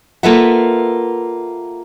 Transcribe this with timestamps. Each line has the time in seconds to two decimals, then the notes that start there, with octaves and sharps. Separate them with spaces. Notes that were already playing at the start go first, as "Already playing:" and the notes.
0.23 A#3 F4 A4 B4 E5 F#5